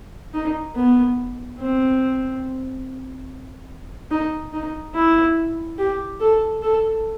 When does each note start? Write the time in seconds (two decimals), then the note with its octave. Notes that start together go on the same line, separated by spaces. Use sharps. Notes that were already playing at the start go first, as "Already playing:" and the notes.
0.34 D#4
0.76 B3
1.59 C4
4.11 D#4
4.53 D#4
4.95 E4
5.78 G4
6.20 A4
6.62 A4